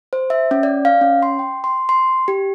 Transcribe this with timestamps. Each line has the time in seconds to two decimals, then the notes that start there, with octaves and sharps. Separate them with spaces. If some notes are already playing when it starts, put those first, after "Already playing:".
0.13 C5
0.30 E5
0.51 C#4
0.63 D5
0.85 F5
1.01 C#4
1.23 C6
1.39 G5
1.64 C6
1.89 C6
2.28 G4